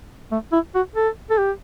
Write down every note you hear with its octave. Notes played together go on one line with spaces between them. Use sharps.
A3
E4
F#4
A4
A4
G4